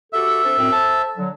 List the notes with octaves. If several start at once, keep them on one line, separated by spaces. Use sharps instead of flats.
F#4 G4 A4 E5
C4 D4 A4
F#2 A2 C4
A4 C5 A5
D3 F#3